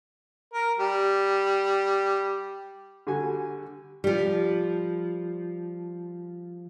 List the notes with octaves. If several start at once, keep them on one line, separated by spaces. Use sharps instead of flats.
A#4
G3
D3 G3 F#4 G#5
F3 G3